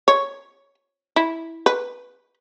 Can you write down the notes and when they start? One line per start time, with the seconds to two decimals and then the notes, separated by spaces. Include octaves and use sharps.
0.08 C#5
1.16 E4
1.66 B4